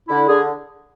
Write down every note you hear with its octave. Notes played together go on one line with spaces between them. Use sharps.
D3 E4
D3 G#4